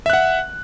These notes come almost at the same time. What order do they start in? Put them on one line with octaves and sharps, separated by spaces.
E5 F#6 F#5